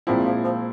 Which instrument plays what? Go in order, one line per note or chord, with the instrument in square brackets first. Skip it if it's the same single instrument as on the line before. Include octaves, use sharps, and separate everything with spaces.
[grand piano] A#2 G#3 C4 E4 [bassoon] F3
[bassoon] F3
F3